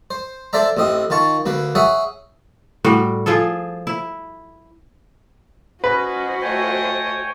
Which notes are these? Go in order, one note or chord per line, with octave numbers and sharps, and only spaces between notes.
C5
D4 A4 C5 D5 E5 A#5
A1 A2 C4 D#5
D#3 F4 A5 C#6
D2 A#3 B4
G#4 C#5 E5 F#5 G#5
A2 G3 F#4
F3 F4 G#4 A4
E4
C#4 F#4 B4 C5 D#5
A3 C#5 D#5 G5 G#5